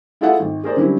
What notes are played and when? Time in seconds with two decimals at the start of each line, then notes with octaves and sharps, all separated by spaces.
0.21 E4 F4 G#4 A4 E5 F#5
0.40 G#1
0.64 G#4 A#4 C5 D5
0.76 D3 F#3 G3 C4 C#4 E4